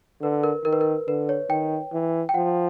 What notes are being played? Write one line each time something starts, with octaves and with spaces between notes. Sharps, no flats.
D3 B4
A#4
D#3 A#4
B4
A#4
D3 B4
C#5
D#3 G5
E3
G5
F3 F#5